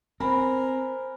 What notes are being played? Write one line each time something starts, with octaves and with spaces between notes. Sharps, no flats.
C4 A#4 C5 G#5 B5